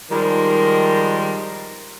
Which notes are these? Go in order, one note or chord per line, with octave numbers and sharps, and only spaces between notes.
D#3 F3 G3 G#3 A#4